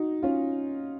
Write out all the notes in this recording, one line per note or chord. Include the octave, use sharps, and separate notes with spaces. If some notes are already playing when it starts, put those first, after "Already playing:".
Already playing: D#4 F#4
C#4 F4